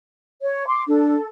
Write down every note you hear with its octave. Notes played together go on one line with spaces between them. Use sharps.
C#5
C6 D6
D4 A4